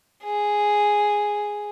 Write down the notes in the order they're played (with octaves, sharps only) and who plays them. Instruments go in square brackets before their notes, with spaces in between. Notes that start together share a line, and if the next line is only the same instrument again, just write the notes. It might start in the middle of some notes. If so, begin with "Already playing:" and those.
[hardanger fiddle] G#4